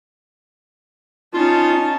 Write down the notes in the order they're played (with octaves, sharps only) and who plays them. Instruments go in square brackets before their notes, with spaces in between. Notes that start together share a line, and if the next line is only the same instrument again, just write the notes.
[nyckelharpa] C#4 A5 [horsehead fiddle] D#4 [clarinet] F4